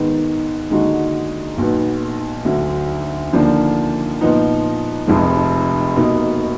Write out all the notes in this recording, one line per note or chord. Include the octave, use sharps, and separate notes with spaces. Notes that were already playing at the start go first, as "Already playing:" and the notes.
Already playing: G#2 D#3 G#3 B3
D#2 D3 G#3 D#4 F#4
B1 A#2 F#3 B3
D2 D3 F#3
D#2 D3 F3 A#3 D4
A#2 F3 B3 D#4
F1 F2 F3 G#3
B2 A#3 D#4